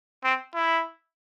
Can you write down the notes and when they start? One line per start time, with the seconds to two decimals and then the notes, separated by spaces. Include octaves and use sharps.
0.24 C4
0.54 E4